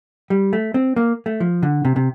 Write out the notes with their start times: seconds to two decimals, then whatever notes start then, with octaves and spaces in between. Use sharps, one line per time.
0.30 G3
0.53 A3
0.74 C4
0.96 A#3
1.26 A3
1.40 F3
1.63 D3
1.85 C3
1.96 C3